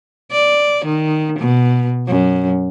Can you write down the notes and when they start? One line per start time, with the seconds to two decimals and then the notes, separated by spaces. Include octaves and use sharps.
0.32 D5
0.85 D#3
1.39 B2
2.08 F#2